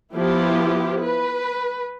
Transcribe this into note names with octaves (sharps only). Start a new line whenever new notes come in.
F3 B3 E4 G4
B4